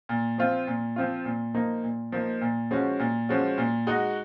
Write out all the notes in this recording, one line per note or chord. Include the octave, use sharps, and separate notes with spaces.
A#2
F3 C4 F4
A#2
F3 C4 F4
A#2
F3 A#3 D#4
A#2
F3 A#3 D#4
A#2
F3 G#3 C#4 F#4
A#2
F3 G#3 C#4 F#4
A#2
G#3 D#4 F#4